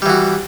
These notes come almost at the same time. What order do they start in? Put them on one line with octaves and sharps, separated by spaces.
G3 E3 F#4